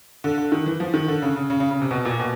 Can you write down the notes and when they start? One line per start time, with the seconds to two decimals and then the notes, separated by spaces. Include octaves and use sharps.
0.24 D3
0.38 D3
0.52 D#3
0.66 E3
0.80 F3
0.94 D#3
1.08 D3
1.22 C#3
1.36 C#3
1.50 C#3
1.60 C#3
1.71 C#3
1.81 C3
1.91 B2
2.05 A#2
2.20 B2